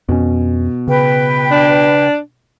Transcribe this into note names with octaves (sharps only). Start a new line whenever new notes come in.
F2 B2 C#4
C#3 B4 G5
D4